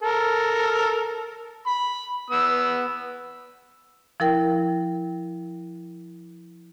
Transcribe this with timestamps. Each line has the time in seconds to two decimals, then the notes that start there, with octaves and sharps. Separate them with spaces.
0.02 A4 A#4
1.67 B5
2.30 B3 E6
4.20 F3 E4 A#4 G5